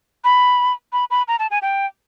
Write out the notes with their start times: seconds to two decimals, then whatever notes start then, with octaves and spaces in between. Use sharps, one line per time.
0.24 B5
0.93 B5
1.11 B5
1.28 A#5
1.39 A5
1.51 G#5
1.62 G5